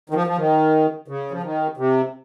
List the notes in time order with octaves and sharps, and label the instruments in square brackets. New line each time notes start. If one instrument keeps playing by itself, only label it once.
[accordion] D#3
F3
F3
D#3
C#3
F3
D#3
C3